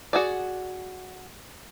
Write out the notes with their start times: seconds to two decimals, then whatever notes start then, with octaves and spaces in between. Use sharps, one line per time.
0.13 F#4 G#4 D5